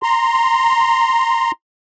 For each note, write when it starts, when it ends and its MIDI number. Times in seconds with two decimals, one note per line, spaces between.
0.03 1.51 82
0.03 1.51 84